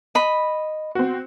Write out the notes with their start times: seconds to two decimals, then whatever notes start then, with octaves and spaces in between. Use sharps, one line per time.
0.15 D#5 B5
0.95 C4 F#4